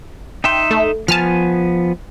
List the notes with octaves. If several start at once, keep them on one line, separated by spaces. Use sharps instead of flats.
D#4 E5 G5 C6
A3
F3 B3 G#5 A5 F6